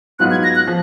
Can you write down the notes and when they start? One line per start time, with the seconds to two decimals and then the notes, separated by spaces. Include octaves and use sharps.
0.19 G#2 F#3 B3 F4 F#6
0.31 G#6
0.44 A#6
0.55 F#6
0.67 F3